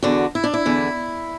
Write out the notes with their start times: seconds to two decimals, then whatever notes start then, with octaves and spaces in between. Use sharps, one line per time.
0.03 E2 D3 F#4
0.35 E4
0.44 D4
0.54 E4
0.66 E2 D3